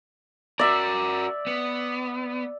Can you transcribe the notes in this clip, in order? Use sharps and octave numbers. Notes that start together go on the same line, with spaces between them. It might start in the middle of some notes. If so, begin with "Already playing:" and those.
F#4 A#4 D5 E5
B3